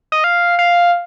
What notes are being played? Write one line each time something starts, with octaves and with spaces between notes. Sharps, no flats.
D#5
F5
F5